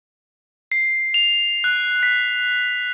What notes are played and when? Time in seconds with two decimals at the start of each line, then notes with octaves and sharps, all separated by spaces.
0.72 C7
1.14 F7
1.64 F#6
2.03 B6